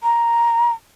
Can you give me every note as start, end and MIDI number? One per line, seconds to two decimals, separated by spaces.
0.03 0.73 82